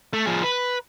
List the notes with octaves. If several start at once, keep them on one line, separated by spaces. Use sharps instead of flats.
A3
F3 G#4
B4